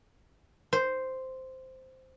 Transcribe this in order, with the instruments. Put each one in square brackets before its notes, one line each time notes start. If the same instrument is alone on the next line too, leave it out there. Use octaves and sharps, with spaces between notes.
[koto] C5